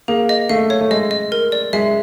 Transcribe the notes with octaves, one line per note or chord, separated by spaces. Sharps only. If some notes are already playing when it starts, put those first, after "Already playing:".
A#3 G#4
D#5
A3 F5
C#5
A3
G#3 D#5
D#5
A#4
D5
G#3 E5